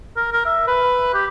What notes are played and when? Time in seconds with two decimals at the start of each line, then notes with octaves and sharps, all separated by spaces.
0.16 A#4
0.33 A#4
0.45 E5
0.67 B4
1.14 G4